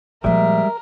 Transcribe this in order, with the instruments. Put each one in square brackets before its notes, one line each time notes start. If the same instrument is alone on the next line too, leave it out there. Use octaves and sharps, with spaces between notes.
[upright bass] A#2 F3 [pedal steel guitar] G3 G#3 [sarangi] A#4 [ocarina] E5